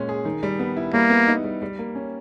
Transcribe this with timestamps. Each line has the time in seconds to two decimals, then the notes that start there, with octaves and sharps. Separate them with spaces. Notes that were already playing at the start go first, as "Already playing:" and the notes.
Already playing: A#2 G#3 C#4
0.09 G#4
0.25 D#3
0.43 G3
0.59 B3
0.76 E4
0.93 G3 A#3
1.10 B3
1.27 D#4
1.44 G3
1.62 G3
1.79 A#3
1.95 C#4